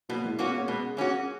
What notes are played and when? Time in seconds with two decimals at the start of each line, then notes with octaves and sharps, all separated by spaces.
0.09 B2 F#3 A#3
0.24 E3 G#3
0.38 G#3 A#3 B3 C#4 F#4
0.53 A#3 C#4
0.68 B2 G#3 B3
0.97 A#3 C#4 F#4